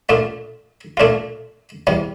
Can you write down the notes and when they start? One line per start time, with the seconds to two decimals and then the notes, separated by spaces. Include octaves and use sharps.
0.09 A#2 A3 D4 F4
0.97 A#2 A3 D4 F4
1.87 E2 C3 G3